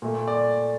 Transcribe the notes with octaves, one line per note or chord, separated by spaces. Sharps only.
A#2 A3
D5